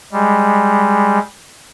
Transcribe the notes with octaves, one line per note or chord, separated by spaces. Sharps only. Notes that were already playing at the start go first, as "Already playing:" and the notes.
G3 G#3